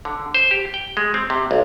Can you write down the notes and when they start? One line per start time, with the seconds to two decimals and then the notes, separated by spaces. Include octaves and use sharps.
0.05 D3
0.34 C5
0.51 G4
0.74 G5
0.97 G#3
1.14 C4
1.30 C3
1.51 B1